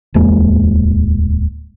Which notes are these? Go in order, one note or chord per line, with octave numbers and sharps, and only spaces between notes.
D1 E2 G#3 A#3